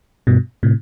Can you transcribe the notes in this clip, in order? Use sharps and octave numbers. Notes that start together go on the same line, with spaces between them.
G2 B2
A2 C3